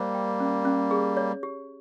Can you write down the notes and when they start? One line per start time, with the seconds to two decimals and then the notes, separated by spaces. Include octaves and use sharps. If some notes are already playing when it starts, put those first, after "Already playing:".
Already playing: G3 A#3 C5
0.14 G5
0.40 C#4
0.65 C#4
0.91 G#4
1.17 C#5
1.43 G4